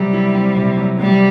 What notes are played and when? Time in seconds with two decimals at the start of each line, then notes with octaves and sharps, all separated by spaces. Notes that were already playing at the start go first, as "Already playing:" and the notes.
Already playing: C3 F#3 G3
0.13 E4
0.35 C4
0.56 C3
0.77 F#3
0.99 C3 G3